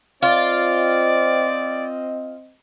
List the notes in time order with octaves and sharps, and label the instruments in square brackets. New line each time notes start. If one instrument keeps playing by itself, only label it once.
[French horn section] C4 D#5 [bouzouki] F4 [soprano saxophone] D5